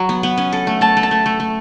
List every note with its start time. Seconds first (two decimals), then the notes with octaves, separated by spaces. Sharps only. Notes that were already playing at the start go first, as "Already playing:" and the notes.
Already playing: F#3
0.09 B3
0.23 B3
0.37 C#4
0.53 A4
0.67 A3
0.81 A3 A5
0.97 A3
1.03 A5
1.11 A3
1.26 A3
1.40 A3